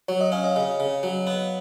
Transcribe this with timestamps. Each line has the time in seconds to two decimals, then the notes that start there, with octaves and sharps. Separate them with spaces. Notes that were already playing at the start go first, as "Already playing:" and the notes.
0.08 F#3 C#5
0.21 D#5
0.32 C#4 F5
0.44 D#5
0.56 C#3 D#5
0.80 C#3
1.03 F#3
1.27 B3